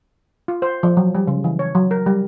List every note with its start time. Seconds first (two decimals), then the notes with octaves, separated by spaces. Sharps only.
0.48 F4
0.62 C5
0.83 F3
0.97 F#3
1.15 G3
1.27 C#3
1.44 E3
1.59 C#5
1.75 F#3
1.91 A#4
2.06 G3